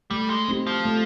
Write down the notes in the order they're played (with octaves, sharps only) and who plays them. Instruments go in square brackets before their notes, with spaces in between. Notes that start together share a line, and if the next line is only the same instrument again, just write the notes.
[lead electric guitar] G3 [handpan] A3
[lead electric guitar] G#3
[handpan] C4 D#4 G4
[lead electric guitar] F3
[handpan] A3